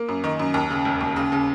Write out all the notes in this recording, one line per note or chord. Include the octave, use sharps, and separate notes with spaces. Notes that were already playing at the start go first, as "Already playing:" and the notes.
Already playing: A#3
F#2
D#3
F#2
D#2
C#3
E1
D#2
C#3
C#3